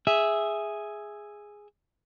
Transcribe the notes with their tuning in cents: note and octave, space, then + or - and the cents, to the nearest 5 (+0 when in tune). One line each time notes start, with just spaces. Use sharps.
G#4 +0 E5 +0